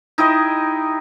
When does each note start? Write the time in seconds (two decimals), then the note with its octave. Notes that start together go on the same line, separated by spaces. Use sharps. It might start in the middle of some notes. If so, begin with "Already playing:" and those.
0.18 D#4 E4 G4 D#5